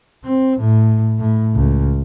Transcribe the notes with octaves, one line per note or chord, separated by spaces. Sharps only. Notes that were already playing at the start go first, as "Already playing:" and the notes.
C4
A2
A2
C#2